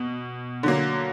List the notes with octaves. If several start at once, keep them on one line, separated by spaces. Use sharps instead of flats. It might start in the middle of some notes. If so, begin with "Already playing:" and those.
Already playing: B2
D3 F#3 A#3